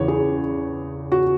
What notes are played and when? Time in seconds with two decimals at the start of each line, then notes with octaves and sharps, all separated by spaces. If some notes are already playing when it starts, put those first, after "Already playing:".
Already playing: E2 C#3 E3 C#5
0.08 G#4
1.12 F#4